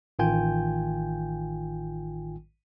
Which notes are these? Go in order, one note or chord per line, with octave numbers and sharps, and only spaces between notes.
A1 D#3 F4 G5 G#5 G6